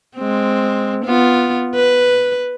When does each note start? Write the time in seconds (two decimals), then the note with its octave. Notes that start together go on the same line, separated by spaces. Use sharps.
0.17 G#3 C4
1.04 B3 F4
1.75 B4